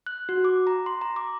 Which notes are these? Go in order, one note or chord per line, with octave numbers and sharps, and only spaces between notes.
F#6
F#4
D6
A#5
C6
A#5
D6